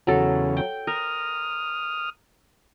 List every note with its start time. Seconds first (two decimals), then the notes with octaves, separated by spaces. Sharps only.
0.07 E2 C#3 F#3 A4
0.57 G5
0.87 A#4 D#6 F6